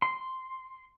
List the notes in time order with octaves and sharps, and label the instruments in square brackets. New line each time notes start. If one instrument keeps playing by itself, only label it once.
[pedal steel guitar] C6